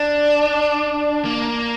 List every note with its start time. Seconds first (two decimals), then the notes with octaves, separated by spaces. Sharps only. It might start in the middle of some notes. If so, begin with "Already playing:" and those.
Already playing: D4
1.25 A#3